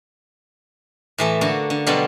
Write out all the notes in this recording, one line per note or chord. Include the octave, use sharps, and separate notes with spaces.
A2 E3 A4
D3 A#3 F#4 A4
D3
B2 F#3 G3 D4 F4 A4